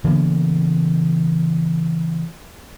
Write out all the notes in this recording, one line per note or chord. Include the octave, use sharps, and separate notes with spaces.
C#3 E3 A#3 B3